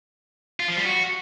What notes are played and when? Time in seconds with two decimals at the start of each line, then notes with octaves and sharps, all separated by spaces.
0.60 F4
0.68 F3
0.77 G3
0.85 F#4